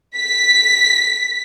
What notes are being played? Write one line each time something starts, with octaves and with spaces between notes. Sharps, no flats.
B6